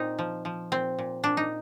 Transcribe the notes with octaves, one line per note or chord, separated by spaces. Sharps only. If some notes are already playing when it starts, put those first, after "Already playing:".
Already playing: A#2 C4 D#4
F3
F3
A#2 C4
A#2
A#2 D4
D#4